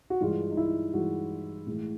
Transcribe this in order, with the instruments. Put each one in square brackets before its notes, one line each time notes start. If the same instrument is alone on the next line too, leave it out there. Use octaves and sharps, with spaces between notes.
[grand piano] F#4
G2 E3 G#3 F4
D#4
E4
G2 E3 G#3 F#4
A2 E3 G#3